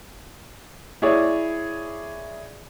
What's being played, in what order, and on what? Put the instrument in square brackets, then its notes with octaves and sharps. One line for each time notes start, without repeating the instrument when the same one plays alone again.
[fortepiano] E4 G#4 C#5 D5